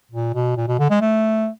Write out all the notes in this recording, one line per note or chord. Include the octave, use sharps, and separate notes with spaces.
A#2
B2
A#2
B2
D3
G#3
A3